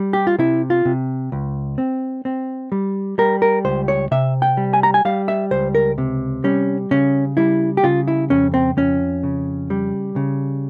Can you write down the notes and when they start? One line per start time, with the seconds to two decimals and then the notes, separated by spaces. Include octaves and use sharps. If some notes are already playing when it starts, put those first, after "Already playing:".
Already playing: G3
0.13 G4
0.27 F4
0.38 C3 E4
0.70 F4
0.85 C3
1.32 C#2
1.78 C4
2.25 C4
2.72 G3
3.18 G3 A#4
3.42 A#4
3.65 C#2 C5
3.88 C#5
4.11 C3 E5
4.42 G5
4.57 G3
4.73 G#5
4.83 A#5
4.94 G#5
5.05 G3 F5
5.28 E5
5.51 C#2 C5
5.75 A#4
5.98 C3
6.44 G3 C#4
6.91 C#3 C#4
7.37 G3 E4
7.77 G4
7.84 C#3 F4
8.08 E4
8.30 F2 C#4
8.54 C4
8.77 F2 C#4
9.23 C#3
9.70 G3
10.16 C#3